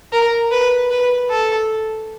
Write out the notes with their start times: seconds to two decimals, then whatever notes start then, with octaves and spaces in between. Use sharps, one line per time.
0.12 A#4
0.52 B4
0.90 B4
1.30 A4